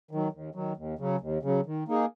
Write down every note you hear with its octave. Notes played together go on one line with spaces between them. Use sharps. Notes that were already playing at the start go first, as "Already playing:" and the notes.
D#3 F#3
D#2
D#3 F#3
D#2
C#3 F#3
D#2
C#3 F#3
D#3
A#3 D#4 G#4